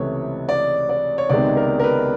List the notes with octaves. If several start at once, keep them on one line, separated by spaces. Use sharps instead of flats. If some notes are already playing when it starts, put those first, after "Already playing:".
Already playing: C#2 C3 E3 A3 C#5
D5
D5
C#5
C#2 C3 D#3 G#3 B3 D5
A#4
A#4
B4